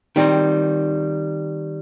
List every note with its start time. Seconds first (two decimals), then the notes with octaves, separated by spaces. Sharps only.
0.16 D#3 G3 C4